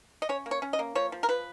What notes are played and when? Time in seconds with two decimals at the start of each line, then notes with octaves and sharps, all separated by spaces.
0.22 D#5
0.29 C#4 C#5
0.46 A#3
0.51 C#5
0.62 C#4
0.73 D#5
0.79 A#3
0.95 F3 C#5
1.12 F3
1.23 A#4
1.29 F3 B4